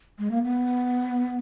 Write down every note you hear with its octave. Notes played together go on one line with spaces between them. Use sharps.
G#3
A#3
B3